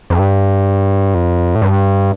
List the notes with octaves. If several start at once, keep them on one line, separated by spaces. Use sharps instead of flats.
F2
G2
F2
A2
G2